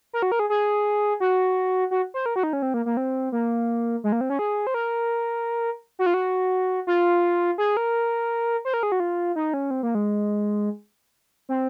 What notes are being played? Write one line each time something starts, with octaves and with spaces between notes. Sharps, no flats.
A#4
F#4
A#4
G#4
G#4
F#4
F#4
C5
A#4
F#4
D#4
C#4
C4
A#3
A#3
C4
A#3
G#3
A#3
C4
C#4
G#4
C5
A#4
F#4
F4
F#4
F4
G#4
A#4
C5
A#4
G#4
F#4
F4
D#4
C#4
C4
A#3
G#3
C4